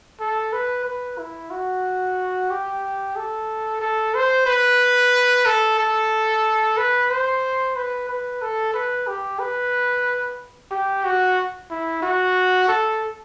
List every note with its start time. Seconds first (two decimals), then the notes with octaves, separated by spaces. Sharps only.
0.20 A4
0.53 B4
0.85 B4
1.18 E4
1.50 F#4
2.50 G4
3.16 A4
3.81 A4
4.15 C5
4.46 B4
5.46 A4
5.79 A4
6.77 B4
7.10 C5
7.76 B4
8.09 B4
8.42 A4
8.74 B4
9.07 G4
9.39 B4
10.71 G4
11.05 F#4
11.71 E4
12.02 F#4
12.68 A4